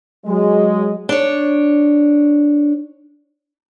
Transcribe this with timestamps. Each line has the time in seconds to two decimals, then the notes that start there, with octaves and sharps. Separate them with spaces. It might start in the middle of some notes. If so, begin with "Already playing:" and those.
0.25 F#3 G#3
1.09 D4 C#5